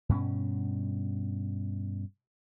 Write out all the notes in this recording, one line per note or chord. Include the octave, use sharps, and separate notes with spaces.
G2 B2 C4 C#4